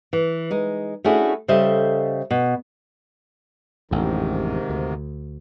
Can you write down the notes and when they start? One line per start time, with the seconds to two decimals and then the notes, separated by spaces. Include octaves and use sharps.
0.13 E3
0.51 G#3 D#4
1.04 A3 C#4 D4 E4 F#4 G#4
1.48 C#3 G3 A4 C5 D#5 E5
2.31 B2
3.91 A1 F2 G#2 C3 D#3
4.70 D2